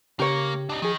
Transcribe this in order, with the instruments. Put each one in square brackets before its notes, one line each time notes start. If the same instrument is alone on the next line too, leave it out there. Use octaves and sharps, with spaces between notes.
[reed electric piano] C#3 [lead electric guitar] A#3 [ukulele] G4 C#5
[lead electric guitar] D4 D#4
[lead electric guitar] D#3 [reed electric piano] F3 G#4